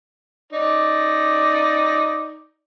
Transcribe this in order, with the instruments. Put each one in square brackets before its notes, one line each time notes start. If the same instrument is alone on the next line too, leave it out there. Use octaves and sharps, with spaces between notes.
[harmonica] D#4 D5